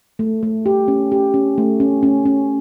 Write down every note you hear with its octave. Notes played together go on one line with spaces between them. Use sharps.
A3
A3
G4
C#4
G4
C#4
A3
C#4
C#4
C#4